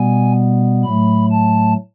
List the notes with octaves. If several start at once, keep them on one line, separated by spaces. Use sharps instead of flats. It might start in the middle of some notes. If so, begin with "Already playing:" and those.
Already playing: B2 G3 B3 G#5
A2 F#3 A3 B5
A5